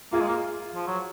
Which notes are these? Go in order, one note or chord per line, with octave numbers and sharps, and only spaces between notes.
A#3 F4 G#4
G#3
A#3
F3
F#3